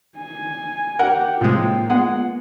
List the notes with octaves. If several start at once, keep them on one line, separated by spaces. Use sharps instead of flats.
G#5
G4 A#4 F#5 G5
A2 C3 F3 G#3 A#3 F4
G#3 B3 F#5